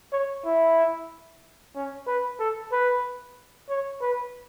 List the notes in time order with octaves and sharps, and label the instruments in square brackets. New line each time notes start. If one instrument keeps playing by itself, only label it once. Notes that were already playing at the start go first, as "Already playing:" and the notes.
[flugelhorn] C#5
E4
C#4
B4
A4
B4
C#5
B4